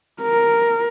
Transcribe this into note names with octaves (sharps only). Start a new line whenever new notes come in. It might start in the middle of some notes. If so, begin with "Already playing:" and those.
A#4